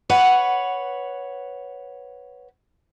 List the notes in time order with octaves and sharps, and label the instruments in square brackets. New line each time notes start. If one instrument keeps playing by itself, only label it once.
[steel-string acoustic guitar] B4 C#5 F#5